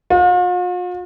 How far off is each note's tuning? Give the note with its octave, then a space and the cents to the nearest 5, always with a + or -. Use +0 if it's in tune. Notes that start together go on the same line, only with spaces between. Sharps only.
F4 +45